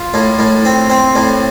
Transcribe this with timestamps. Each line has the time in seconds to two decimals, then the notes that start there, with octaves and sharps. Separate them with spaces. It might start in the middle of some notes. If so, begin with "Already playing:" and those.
Already playing: F4
0.14 A2
0.39 A2
0.65 C4
0.90 C4
1.16 A2